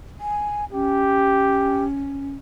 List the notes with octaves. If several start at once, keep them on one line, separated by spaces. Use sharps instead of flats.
G#5
C#4 G4